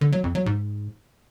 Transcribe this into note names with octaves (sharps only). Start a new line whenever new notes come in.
D3
F#3
F2
F#3
G#2